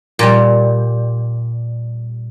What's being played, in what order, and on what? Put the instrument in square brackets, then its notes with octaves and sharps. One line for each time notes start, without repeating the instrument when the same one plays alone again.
[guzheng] A#2 G3